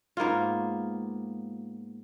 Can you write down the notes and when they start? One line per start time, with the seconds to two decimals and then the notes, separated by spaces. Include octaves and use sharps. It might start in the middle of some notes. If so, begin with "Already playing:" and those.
0.17 G#2 A#3 B3 F4